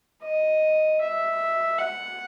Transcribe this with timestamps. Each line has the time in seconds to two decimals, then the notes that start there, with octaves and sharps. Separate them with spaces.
0.23 D#5
1.01 E5
1.79 F#5